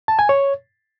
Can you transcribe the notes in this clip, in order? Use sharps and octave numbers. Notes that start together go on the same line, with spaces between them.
A5
G#5
C#5